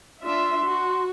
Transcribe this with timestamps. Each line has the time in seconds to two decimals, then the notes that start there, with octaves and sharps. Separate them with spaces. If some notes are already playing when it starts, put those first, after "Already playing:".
0.23 D4 F4 E5 C6
0.65 F#4